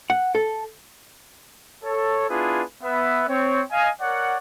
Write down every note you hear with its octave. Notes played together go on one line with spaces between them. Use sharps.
F#5
A4
A4 C#5
B3 D4 E4 F4 G#4 B4
B3 B4 E5
C4 C#5
D#5 F5 G#5
A#4 C#5 D5 F#5